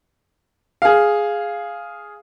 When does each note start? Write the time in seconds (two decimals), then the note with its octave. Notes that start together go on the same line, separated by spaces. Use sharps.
0.82 G#4 F5